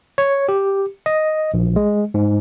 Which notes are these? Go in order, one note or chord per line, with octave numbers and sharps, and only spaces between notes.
C#5
G4
D#5
A#1
G#3
G#2